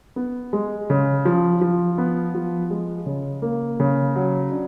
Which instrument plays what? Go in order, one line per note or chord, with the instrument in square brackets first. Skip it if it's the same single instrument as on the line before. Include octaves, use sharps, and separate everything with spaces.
[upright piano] B3
G#3
C#3
F3
F3
B3
F3
G#3
C#3
A#3
C#3
F#3
D4